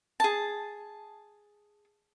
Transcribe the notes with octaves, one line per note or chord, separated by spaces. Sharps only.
G#4 A5